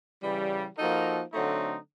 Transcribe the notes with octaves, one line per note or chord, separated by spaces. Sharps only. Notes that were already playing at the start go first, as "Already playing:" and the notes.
C#3 E3 G3
F3 A#3 D#4 F#4 A4
D3 F#3 A3 C4 D#4